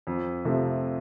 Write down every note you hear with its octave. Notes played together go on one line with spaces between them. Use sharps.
F2
C3 F3 A3